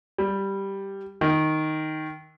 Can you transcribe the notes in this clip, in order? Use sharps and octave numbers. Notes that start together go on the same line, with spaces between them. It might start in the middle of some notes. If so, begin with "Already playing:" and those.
G3
D#3